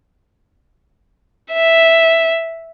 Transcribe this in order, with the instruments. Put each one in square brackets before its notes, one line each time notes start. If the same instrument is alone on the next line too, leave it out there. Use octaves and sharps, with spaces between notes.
[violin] E5